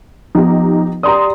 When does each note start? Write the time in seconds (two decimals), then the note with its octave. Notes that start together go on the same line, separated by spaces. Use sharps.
0.35 F3 B3 D#4 G4
1.03 G4 D5 A#5 C6 D#6